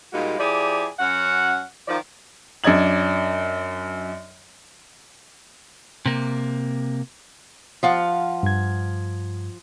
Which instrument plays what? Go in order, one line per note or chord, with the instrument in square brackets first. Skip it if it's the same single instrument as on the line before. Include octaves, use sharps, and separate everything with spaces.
[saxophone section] A#2 G3 G#3 A#3 D#4 F#4
F3 E4 G4 G#4 D5
F#2 C#4 F#4 F#5
D#3 F3 D5
[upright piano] F#2 D4 D#5 G#6 F#7
[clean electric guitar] C3 A#3
[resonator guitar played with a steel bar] F3 F5 F#5
[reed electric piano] G2 G#6